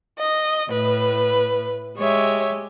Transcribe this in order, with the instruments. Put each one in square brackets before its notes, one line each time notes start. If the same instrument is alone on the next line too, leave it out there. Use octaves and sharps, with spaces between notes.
[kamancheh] D#5
[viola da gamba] A2 [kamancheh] B4
[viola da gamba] G#3 G4 [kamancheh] C#5 E5